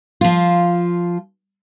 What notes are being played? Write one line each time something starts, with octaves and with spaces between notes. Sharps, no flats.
F3 F4